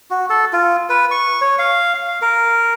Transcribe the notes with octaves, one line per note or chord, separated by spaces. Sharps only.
F#4
A4
F4
B4
C#6
C#5
F5
F5
A#4